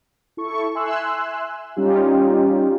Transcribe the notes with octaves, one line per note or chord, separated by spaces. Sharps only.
E4 A4 C#6
E5 G#5 C6 E6 F#6
G3 C#4 D#4 F4 G4